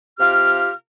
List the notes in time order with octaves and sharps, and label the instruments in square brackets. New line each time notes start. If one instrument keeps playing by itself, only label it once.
[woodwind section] C3 F4 G4 F5 F6